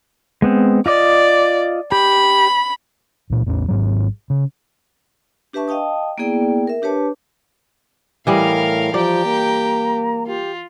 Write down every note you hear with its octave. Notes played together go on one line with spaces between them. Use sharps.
G#3 B3 C4
F4 D5 D#5 D6
G4 B5
C#2 A#2
A1 E2 C#4
G#1 G#2 F#3
C#3
D4 G4 B4 E5 A5 C#6
D#5 F5 G5 A5 D#6
A#3 B3 E4 G#4 D5 G5
A#4 E5
D4 G4 B4 C#5 A5 D6
A2 E3 G3 A#4 D#5 F5
F3 G4 D5 G5 A#5
A#3
F4 G4